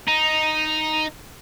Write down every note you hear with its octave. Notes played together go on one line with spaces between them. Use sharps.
D#4